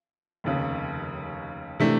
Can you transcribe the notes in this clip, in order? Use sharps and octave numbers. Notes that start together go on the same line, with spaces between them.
F1 D#2 C#3
C3 E3 A3 D4